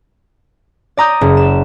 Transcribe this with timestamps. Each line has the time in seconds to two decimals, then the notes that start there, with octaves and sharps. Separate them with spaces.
0.97 D5 A#5 D#6 G6
1.21 F#1
1.37 E7